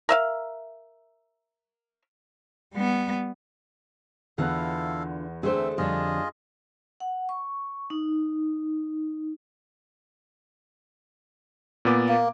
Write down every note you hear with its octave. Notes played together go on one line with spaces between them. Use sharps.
A#4 E5 F5
G3 B3
E2 D3 B3 E4 F4 A4 F5 F#6
D3 A3 C4 D4 G#4 B4 C5 E5
F2 D3 G3 D4 F4 G#4 C#5 D#5
F#5
C#6
D#4
A#2 B3 D6
A#3